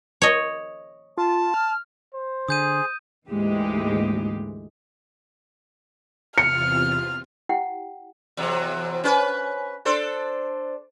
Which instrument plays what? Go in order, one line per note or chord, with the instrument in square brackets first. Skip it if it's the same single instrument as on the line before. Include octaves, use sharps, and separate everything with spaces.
[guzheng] C#5 D#5
[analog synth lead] F4 [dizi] A5
[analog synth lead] F6
[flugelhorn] C5
[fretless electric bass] D3 [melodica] G#4 [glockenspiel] D#6 G6 D#7
[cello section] D2 G#2 E3 G#3 A#3 G4
[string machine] E2 C3 F4 [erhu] F6 [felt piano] C#7
[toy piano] E4 G4 F#5 G5
[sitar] E2 C3 F#3
C#4 B4
D4 A4 C5